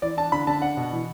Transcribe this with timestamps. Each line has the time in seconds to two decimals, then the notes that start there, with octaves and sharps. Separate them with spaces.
0.02 E3 D5
0.17 D4 A5
0.32 D3 B5
0.47 D3 A5
0.62 D4 F#5
0.77 B2
0.92 E3